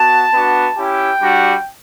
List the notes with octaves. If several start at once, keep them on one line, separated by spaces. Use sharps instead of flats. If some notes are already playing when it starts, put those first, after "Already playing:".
Already playing: B3 F#4 A5
B3 D4 F#4
C#4 E4 G4 G5
G3 D4 F#4